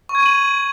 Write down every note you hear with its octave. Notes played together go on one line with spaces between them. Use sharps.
C#6
G#6
D#7
F#7